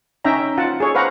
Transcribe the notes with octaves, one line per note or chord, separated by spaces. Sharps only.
C#4 D#4 E5 G5 A#5
F4 F#5 A5
G#4 A4 C#5
B4 C5 F5 F#5 A#5